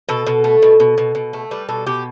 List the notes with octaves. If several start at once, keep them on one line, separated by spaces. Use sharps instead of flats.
B2 A4
B2
A3
B2
B2
B2
B2
A3
G3 B4
B2 A4
B2 G4